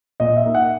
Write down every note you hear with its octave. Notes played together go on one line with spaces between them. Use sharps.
A#2 D#5
E5
A#3 D#4
F#5